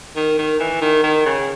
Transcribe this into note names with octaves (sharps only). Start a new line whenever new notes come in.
D#3
D#3
E3
D#3
D#3
C#3